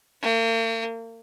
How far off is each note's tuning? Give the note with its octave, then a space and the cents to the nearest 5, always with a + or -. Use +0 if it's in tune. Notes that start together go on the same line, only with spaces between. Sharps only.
A#3 -45